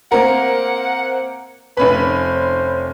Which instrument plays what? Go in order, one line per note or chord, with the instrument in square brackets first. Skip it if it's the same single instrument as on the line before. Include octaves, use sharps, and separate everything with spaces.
[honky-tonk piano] A#3 C4 A#4 [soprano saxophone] F#5
[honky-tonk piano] F1 C#4 B5 [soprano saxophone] B4
[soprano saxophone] C5